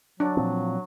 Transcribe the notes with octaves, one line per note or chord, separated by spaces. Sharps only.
F#3 D4
A#2 F3 C4